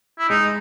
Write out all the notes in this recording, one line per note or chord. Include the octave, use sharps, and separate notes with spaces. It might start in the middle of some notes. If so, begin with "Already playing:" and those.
E4
G#3 D#4